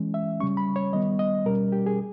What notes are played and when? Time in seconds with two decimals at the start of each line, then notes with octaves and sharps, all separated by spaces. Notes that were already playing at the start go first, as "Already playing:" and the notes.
Already playing: E3 G#3 C#4
0.14 E5
0.40 C#3 G3 C#4 C#6
0.57 B5
0.76 C#5
0.93 D#3 G3 B3 D#5
1.19 D#5
1.45 B2 G3 C#4 A#4
1.72 G4
1.86 G#4